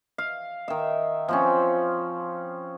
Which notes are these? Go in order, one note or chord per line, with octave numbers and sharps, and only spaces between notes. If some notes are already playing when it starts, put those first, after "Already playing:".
F5
D#3 E5
F3 C4 C#4